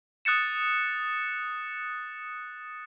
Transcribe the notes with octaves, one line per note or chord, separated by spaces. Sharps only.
D#6 F#6 A6 C#7 E7